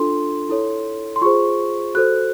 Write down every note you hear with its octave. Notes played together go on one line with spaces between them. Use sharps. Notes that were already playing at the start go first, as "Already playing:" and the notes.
Already playing: D4 F4 A4 C6
E4 A4 C#5
C6
F4 G#4 C5 C#6
F#4 A4 C5 F#6